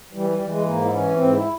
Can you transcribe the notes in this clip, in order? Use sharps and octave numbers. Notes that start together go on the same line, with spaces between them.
E3 G3
G3
E3
G#3
G#2 A#3
E4
E3 C#4
G#2 C4
E4